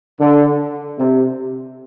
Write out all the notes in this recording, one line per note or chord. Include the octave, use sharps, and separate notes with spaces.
D3
C3